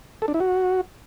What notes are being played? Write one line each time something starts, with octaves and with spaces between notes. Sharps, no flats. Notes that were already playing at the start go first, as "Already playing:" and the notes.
A4
D4
E4
F#4